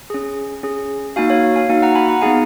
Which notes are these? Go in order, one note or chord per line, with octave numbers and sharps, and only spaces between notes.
C#4 G#4
C#4 G#4
A#3 D#4 F#4 F5 G#5
C#5 F5
F5 G#5
A#3 D#4 F#4 F5 G#5
F#5 A#5
G#5 B5
F#5 A#5
B3 D#4 G#4 F5 G#5